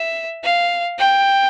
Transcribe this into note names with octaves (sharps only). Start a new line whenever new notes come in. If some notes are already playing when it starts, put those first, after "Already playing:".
Already playing: E5
F5
G5